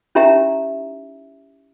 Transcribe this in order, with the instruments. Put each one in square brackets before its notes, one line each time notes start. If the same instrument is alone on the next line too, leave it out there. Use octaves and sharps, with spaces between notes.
[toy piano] C#4 D#4 E4 G4 E5 A#5